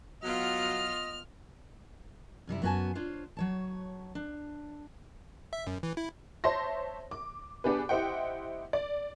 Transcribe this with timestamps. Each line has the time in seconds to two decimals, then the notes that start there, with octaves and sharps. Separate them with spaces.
0.23 F#3 B3 F4 D#5 F6
2.47 F#2 C3 G3 E4
2.62 F#2 B3 F#4 A#4 G#5 A5
2.95 D4 F4 C5 C#5
3.37 F#3 C#5 A5
4.15 D4
5.53 E5
5.67 F#2
5.83 E3
5.97 E4
6.44 C5 C#5 E5 A5 C6 A#6
7.11 D6
7.64 B3 D4 G4 G#4 B4
7.89 E4 G4 C5 D#5 F#5 G5
8.73 D5